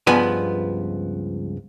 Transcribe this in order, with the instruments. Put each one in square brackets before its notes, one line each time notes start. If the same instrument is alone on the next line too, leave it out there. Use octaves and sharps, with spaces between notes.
[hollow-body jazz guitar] C#2 G2 F3 B3 B4 G#5